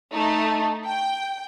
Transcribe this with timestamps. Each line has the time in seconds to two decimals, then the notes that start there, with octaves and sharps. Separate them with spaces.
0.14 A3 D#4
0.86 G5